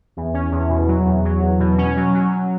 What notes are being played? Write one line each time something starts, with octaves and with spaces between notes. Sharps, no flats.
E2
C#4
E2
B2
F#3
E2
F#3
E2
B2
C#4
F#3
F#3
F#3